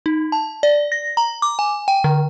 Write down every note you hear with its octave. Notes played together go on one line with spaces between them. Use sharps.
D#4
A5
D5
A#6
A#5
D6
G#5
G5
D3